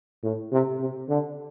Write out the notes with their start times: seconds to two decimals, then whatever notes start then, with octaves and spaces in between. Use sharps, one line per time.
0.23 A2
0.52 C3
0.80 C3
1.09 D3